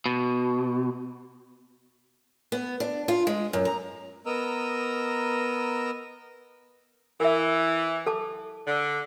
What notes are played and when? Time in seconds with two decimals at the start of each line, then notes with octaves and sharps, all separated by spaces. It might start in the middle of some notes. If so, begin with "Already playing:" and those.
0.06 B2
2.52 B3
2.80 D4
3.08 F4
3.27 G#3
3.53 F#2
3.65 A#5
4.26 B3 A#4 D#5 A#5 E6
7.20 E3 A#4 E5
8.07 A4 A5 D6
8.66 D3